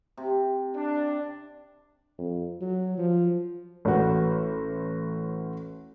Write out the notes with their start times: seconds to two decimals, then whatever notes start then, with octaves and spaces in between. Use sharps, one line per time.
0.17 C3
0.75 D4
2.18 F2
2.61 F#3
2.98 F3
3.85 A1 F#4